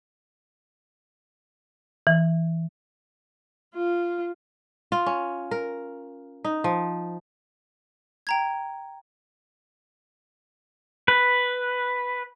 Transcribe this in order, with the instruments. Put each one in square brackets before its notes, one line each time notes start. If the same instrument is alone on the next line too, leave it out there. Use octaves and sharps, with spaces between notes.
[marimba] E3
[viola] F4
[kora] F4
C#4
A#4
D#4
F3
[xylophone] G5 A#5 G#6
[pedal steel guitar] B4